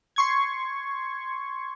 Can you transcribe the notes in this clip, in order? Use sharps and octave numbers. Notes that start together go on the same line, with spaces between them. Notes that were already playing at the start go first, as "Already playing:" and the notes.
C6 C#6 G#6